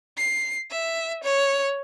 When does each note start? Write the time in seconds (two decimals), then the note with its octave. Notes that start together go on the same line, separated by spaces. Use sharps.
0.17 C7
0.71 E5
1.23 C#5